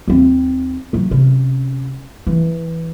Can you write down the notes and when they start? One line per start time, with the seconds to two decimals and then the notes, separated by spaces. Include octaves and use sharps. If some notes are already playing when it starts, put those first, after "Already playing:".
0.08 D#2 C4
0.93 F#2 F#3
1.11 C3 C#4
2.27 E3